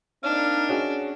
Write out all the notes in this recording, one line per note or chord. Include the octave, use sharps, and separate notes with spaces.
A#3 C4 D4 D#4 F5
C#4 F#4 G#4